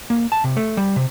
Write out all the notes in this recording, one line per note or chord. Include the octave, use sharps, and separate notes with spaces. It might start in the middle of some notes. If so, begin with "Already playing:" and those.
A#3
A5
C3
A3
G3
C3